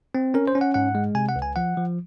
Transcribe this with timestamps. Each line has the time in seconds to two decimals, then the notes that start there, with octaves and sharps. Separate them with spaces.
0.15 C4
0.34 C#4 A#4
0.48 C5
0.55 C#4
0.61 F#5
0.74 G#2 F#5
0.95 G#3
1.15 C3 G#5
1.29 F#5
1.36 C#2
1.42 G#5
1.56 F3 F#5
1.77 F3